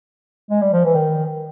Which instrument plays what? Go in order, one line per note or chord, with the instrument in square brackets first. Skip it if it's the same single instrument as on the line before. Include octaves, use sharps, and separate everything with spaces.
[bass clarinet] G#3
G3
F3
E3
D#3